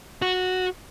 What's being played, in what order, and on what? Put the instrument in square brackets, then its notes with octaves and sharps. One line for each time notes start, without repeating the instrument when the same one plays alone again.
[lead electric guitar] F#4